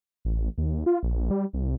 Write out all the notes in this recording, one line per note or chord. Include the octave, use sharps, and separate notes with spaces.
A1
D#2
F4
A#1
G3
C2